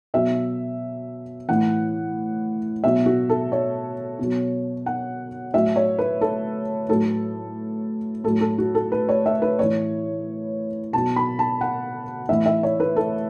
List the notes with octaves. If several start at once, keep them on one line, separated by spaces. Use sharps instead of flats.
B2 F#3 E5
A2 E3 F#5
B2 F#3 E5
F#4
A4
C#5
B2 F#3
F#5
A2 F#3 E5
C#5
B4
A4
A2 F#3 A4
A2 F#3 A4
A4
F#4
A4
B4
C#5
E5
B4
A2 E3 C#5
B2 F#3 A5
B5
A5
F#5
A2 E3 E5
E5
C#5
B4
A4